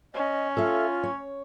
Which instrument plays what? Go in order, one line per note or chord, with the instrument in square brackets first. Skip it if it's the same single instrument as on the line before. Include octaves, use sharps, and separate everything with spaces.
[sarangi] C#4 [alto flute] D#5
[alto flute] F4 [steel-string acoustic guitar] A4 E5 F5
[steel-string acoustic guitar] C#5